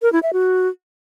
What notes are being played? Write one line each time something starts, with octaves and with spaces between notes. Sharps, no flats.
A#4
E4
E5
F#4